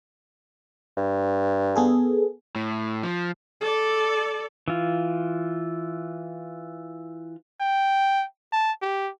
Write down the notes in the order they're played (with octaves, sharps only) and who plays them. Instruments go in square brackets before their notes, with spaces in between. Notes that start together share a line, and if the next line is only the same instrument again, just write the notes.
[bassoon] G2
[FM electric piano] B3 G#4 A4
[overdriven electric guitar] A2
F3
[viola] A4 D5
[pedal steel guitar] E3 F4
[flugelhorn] G5
A5
G4